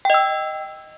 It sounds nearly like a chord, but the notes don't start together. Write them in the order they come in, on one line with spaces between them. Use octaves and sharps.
G5 D#5 E6